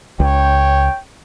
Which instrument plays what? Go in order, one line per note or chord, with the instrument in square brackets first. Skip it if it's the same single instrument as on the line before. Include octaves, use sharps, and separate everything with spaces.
[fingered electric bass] C#2 [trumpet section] C#5 G5